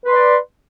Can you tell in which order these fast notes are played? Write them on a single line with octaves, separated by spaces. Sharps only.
B4 C6 D5